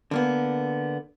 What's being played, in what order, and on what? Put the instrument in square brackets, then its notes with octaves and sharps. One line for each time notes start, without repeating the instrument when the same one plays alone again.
[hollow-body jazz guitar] D3 A#3 B3